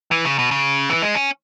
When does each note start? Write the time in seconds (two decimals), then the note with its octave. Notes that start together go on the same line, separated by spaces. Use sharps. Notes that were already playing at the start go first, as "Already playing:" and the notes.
0.11 E3
0.25 C#3
0.39 B2
0.51 C#3
0.90 E3
1.02 G#3
1.15 C#4